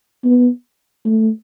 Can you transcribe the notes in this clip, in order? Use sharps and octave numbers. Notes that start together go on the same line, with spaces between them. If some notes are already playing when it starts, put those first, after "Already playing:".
B3
A3